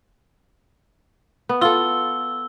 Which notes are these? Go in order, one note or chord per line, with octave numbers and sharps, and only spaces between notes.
B3
F4 A4 E6 G7